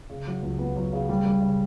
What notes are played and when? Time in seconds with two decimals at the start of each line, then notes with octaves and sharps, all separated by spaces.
0.10 C#3
0.27 F#3
0.42 C#2
0.59 B3
0.76 F#3
0.93 C#3
1.09 G3
1.26 G3
1.42 C#3